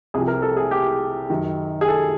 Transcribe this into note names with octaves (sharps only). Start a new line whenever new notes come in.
C2 C3 F3 G#4
A#4
A4
G#4
G4
F#2 D#3
G#4
A4